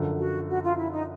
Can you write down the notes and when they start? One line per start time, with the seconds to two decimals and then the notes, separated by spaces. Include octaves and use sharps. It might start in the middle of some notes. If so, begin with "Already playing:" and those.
Already playing: F#2 D3 F3
0.19 F#4
0.48 F#4
0.63 F4
0.77 E4
0.92 D#4